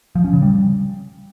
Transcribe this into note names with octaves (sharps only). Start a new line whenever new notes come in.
F3
C#4
C#3
G3